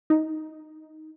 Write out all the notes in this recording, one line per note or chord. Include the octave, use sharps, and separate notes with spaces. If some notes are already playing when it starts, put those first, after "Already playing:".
D#4